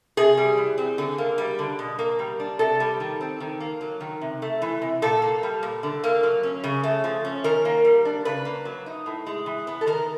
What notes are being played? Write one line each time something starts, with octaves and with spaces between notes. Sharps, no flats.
C3 G#4
G3
E3
C4
D3
A#3
G3
D3
B2
A#3
G3
D4
C3 A4
G3
D#3
C4
D#3
A#3
F#3
D#3
C3
A3
E3
C3
A#2 A4
A#3
G3
A#2
D3
A#3
F#3
C#4
C#3
A3
F3
C#4
D#3 A#4
A#3
G3
D4
C#3 B4
A#3
F#3
D#4
A2
G#3
E3
B3
A4
D#3 A#4